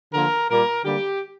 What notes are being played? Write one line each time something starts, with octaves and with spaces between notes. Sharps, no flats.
D3 F3 A#3 A#4
A#2 G3 A#3 A#4
D3 G3 A#3 G4